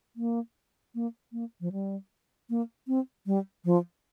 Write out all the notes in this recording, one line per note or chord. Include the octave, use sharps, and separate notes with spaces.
A#3
A#3
A#3
F3
G3
A#3
C4
G3
F3